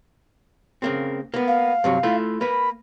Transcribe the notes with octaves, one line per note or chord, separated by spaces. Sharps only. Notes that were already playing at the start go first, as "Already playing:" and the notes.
C#3 A#3 C4
A#3 B3
F5
G2 C3 F#3
A3 E4 F4
A#3 B4 B5